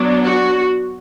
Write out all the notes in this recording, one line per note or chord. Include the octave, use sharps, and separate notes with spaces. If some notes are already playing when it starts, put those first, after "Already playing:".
Already playing: F#3 B3 D4
F#4